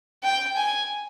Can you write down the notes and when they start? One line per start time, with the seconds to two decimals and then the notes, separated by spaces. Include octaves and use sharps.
0.23 G5
0.56 G#5